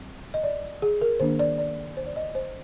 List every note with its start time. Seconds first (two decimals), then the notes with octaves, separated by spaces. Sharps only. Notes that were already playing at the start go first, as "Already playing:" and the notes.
Already playing: G3 C4
0.34 D#5
0.43 D5
0.82 G#4
1.01 A#4
1.20 D#3 A#3 D4 C5
1.39 D5
1.58 D5
1.97 C5
2.06 D5
2.16 D#5
2.35 C5